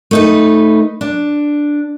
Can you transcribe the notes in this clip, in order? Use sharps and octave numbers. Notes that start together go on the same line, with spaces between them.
A3 D#4 B4
D4